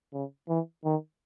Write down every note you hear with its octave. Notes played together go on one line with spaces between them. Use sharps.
C#3
E3
D#3